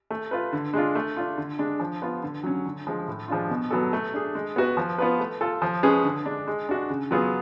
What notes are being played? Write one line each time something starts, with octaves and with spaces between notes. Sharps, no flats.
A3
F4 B4
D3
G#3 D4 F4
A3
D4 F4
D3
G#3 D4
F3
B3 F4
D3
F#3 C#4
D3
F3 G#3
A2
F3 G#3 D4 F4
B2
F#3 B3 F#4 A4
A3
D4 G#4
G#3
B3 F#4 B4
F3
B3 F4 B4
A3
F4 A4
F3
G#3 C#4 G#4 B4
D3
G#3 D4
G#3
D4 F#4
C#3
F#3 B3 F4 G#4